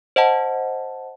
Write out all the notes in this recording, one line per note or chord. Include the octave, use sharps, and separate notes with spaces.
C5 D#5 F#5 A5